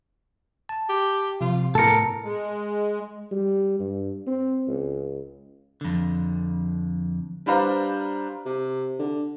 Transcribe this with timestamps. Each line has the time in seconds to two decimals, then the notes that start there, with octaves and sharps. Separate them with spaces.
0.69 A5
0.89 G4
1.41 C3 F3 F4
1.75 A2 B3 A4 A#4 C#7
2.24 G#3
3.31 G3
3.79 G2
4.27 C4
4.68 C#2
5.81 F2 D3
7.46 G3 D4 B4 C5 F5 A#5
8.46 C3
8.99 D3